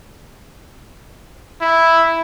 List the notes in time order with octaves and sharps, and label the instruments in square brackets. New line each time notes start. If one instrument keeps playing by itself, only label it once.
[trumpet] E4